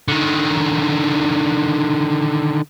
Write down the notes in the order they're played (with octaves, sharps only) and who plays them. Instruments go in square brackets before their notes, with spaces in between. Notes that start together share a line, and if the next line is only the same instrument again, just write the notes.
[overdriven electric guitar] D3 D#3